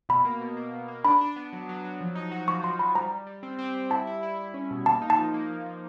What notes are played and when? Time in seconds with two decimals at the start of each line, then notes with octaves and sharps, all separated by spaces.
0.09 B2 B5
0.25 A#3
0.41 B2
0.57 A#3
0.74 B2
0.88 A#3
1.04 D4 B5
1.21 D4
1.36 B3
1.53 F#3
1.69 F#3
1.84 F#3
2.01 F3
2.15 D#4
2.32 F#4
2.48 F3 C#6
2.63 F3 C6
2.79 F3 B5
2.95 G3 A#5
3.11 G3
3.27 G3
3.43 C4
3.59 C4
3.75 G3
3.90 E4 A5
4.07 E4
4.23 E4
4.38 E4
4.54 C#4
4.71 B2
4.86 A#3 A5
5.02 D#4
5.10 A5
5.18 F3
5.34 A#3
5.50 F3
5.65 F3